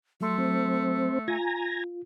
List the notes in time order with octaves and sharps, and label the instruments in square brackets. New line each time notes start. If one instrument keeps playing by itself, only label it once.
[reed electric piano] F#3 C6 [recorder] A3
[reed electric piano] F#3 [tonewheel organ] C4
[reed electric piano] F4 [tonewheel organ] G#5 A#5